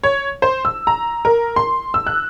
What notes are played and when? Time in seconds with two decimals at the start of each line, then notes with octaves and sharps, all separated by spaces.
0.04 C#5
0.42 C5
0.65 E6
0.87 A#5
1.25 A#4
1.56 C6
1.94 E6
2.07 F#6